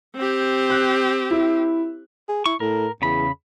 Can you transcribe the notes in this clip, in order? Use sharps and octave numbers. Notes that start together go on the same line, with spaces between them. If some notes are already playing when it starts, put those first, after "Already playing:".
C4 G4
F#6
E4
G#4
E4 C#6
A2 A#4
E2 C#3 B5